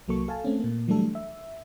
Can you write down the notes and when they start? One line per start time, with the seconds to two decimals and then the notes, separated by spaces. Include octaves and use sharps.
0.08 C2 F#3 A#3 A4 C#6
0.28 A4 F5 G#5 A5
0.44 A3 C4 C#4
0.60 A#2 A#3
0.88 E3 F#3 G3 A3 D4 A4
1.15 E5